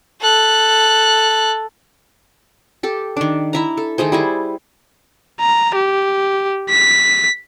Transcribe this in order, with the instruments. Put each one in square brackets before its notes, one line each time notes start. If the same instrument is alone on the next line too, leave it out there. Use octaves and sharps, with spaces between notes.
[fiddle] A4 F#6
[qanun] G4 A4
D#3 D4
E4 E5 A#5
A4
D#3 A3 G#4 C5
G3 E4 G#4
[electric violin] A#5
G4
B6